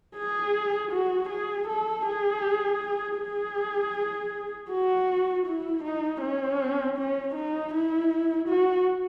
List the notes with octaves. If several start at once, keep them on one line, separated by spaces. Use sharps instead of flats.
G#4
F#4
G#4
A4
G#4
G#4
F#4
E4
D#4
C#4
C#4
D#4
E4
F#4